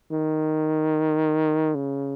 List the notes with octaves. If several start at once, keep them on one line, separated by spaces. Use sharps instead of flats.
D#3
C#3